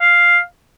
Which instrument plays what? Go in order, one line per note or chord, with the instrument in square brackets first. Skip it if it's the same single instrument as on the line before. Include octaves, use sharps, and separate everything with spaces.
[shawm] F5